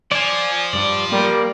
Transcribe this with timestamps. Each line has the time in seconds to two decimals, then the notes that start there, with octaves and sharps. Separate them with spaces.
0.12 F3 D5 G#5
0.73 G2 D5
1.12 G3 A#3 D5